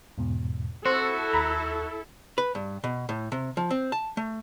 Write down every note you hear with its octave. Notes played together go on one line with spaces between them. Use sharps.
E2 G#2 B2
C4 E4 F#4 A4 C5
D#2 A#5 B5
B4
G2
B2
A2
C3
F3
C4
A5
A3